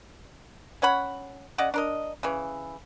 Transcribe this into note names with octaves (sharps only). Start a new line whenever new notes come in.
C#4 C#5 F#5 B5
C#3 D5 D#5 F#5
D4 A#4 D#5
C#3 E3